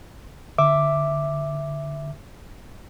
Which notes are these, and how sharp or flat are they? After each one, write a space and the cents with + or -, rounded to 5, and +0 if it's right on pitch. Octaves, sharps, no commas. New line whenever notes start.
D3 +0 E5 +0 D6 +0